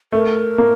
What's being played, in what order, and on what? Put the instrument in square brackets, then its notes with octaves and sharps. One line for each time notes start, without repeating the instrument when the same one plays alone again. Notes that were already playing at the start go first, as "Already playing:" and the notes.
[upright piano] A3 [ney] A#4
[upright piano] A#3